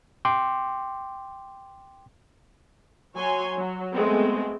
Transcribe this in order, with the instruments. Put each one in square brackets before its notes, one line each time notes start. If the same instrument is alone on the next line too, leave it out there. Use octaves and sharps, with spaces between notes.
[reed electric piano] G5 C6 D6
[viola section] F#3 C#5 G#5 C6
F#3
G#3 A3 B3 C4